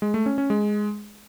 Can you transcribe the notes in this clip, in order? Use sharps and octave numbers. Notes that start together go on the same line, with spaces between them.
G#3
A3
C#4
C#4
G#3